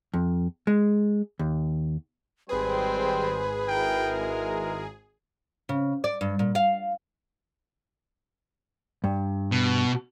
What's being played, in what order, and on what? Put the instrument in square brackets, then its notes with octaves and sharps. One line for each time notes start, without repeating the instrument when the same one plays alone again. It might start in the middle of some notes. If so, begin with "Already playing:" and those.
[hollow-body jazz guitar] F2
G#3
D#2
[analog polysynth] G#1 G#4 [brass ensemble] G3 G#3 C4 [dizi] B4 [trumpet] C5
[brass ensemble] E4 F#4 A#4 [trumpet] G5
[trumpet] G#3
[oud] C#3
D5
G2
A#2
F5
[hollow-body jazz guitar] G2
[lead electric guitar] B2